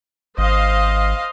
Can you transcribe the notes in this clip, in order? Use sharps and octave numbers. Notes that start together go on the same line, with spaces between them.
G#1 C5 D#5 F5